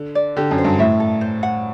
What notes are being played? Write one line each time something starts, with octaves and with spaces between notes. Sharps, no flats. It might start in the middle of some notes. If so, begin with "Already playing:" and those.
Already playing: D3
D5
D3 G4
F#2
C5
G2
A2 E5
A4
C5
F#5